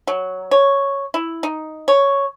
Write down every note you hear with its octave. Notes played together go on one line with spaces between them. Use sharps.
F#3
C#5
E4
D#4
C#5